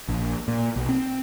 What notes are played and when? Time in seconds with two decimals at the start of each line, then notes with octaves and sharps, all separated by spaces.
0.08 A#1
0.48 A#2
0.76 B1
0.89 C4